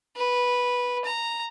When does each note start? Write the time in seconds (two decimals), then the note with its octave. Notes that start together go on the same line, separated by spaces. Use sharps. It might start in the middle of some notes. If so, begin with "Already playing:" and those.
0.17 B4
1.04 A#5